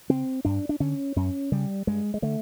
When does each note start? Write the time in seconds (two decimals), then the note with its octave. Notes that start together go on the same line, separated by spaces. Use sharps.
0.10 C#3 C4
0.45 G2 D4
0.69 D4
0.80 D3 C#4
1.16 F#2 C#4
1.52 C#3 G3
1.87 G2 G#3
2.14 G#3
2.22 D3 A3